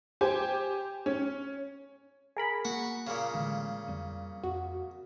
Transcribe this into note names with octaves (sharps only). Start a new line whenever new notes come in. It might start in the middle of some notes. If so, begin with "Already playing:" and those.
G4 C5 G#5
C#4
G#4 A#4 B5
A#3 F#4
A#2 C#3
A1 D3 G#3
F2 G3
F2 F#4